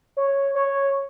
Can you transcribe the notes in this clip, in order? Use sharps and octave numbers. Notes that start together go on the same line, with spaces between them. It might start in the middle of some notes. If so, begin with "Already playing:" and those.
C#5
C#5